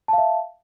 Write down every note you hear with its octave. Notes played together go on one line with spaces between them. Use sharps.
E5 F5 A5